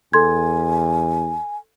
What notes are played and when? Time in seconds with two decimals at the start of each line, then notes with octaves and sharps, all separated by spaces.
0.13 E2 A4 G#5 C6 G#6